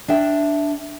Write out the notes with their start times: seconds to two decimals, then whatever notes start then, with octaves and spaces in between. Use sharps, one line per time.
0.08 D4 E5 G5